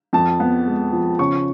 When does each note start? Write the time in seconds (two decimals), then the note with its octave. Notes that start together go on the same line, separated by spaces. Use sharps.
0.13 F2 A5
0.40 B3
0.66 G#3
0.93 F3
1.19 C#3 C#6